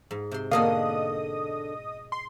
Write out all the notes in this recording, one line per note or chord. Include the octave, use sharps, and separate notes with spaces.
G#2
C3 C6
G#2 B2 D3 A#3 D4 D#5 F5 D#6
C6